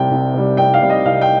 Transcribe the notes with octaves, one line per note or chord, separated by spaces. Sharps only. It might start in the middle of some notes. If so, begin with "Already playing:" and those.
Already playing: C2 C3 G3 G5
C2
C3 G3
C2 G5
F5
C3 G3
D#5
C2 F5
G5